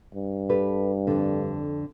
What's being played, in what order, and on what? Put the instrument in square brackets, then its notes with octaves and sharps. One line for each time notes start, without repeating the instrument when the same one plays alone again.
[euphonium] G2
[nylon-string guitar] G4 A4 B4
F2 D3